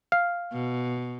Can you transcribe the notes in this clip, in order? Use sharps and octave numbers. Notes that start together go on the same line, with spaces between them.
F5
B2